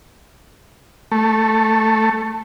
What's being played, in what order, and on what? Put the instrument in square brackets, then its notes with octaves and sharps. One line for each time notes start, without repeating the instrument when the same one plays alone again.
[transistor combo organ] A3